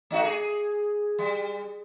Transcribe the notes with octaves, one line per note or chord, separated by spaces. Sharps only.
A3 D#4 F#4
G#4
G3